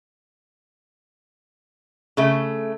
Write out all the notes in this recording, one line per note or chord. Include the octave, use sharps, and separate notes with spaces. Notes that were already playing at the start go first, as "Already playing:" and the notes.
C#3 A3